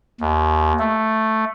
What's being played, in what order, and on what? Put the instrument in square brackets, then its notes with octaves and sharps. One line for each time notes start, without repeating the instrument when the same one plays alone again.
[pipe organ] D#2
A3